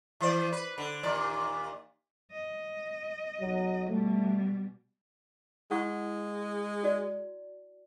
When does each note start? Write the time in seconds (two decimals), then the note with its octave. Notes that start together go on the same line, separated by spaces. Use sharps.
0.20 E3 C5 D5
0.52 B4
0.78 D3
1.03 D#2 A#2 D5
2.32 D#5
3.41 B1 F#3
3.90 B2 G3 A3
5.71 G#3 E4 F#5 C#6
6.83 F#4 D5